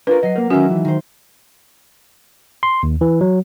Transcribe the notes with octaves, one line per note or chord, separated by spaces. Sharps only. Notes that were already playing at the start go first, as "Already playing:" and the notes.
D4 F4 A#4 B4
F#3 D#5 C7
A#3 A#4
D#3 G#3 C#4 F#4 A#4 E5
E3
D#3 C5
C6
D#2
E3
F#3